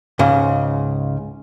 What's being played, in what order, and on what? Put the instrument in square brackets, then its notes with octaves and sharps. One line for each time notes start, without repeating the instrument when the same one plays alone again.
[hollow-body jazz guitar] C#2 G#2 C#3